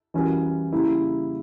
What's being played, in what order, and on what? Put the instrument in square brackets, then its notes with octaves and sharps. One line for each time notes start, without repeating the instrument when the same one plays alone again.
[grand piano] E3 G3 C#4 F#4 A#4
C#3 G3 A#3 E4 A#4